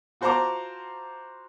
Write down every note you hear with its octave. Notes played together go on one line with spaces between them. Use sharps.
F4 F#4 C5 A5 A#5 D6